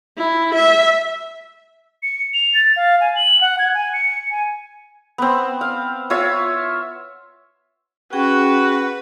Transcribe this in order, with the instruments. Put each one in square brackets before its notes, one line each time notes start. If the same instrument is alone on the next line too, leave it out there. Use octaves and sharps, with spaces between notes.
[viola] E4
E5
[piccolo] C#7
F7
A6
F5
G#5
F#7
F#5
G#6
G#5
C#7
G#5
[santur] B3 C4
F5
F4 C#5 E5
[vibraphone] C#4 G#4 G5 [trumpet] F#4 [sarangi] B4